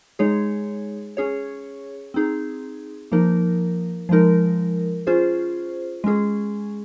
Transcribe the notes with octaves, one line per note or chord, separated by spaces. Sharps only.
G#3 D#4 G#4 C#5
C#4 G#4 C#5
C4 D#4 G#4
F3 A#3 D#4 A#4
F3 G#3 D#4 A#4
C#4 F4 G#4 C5
G#3 C#4 G#4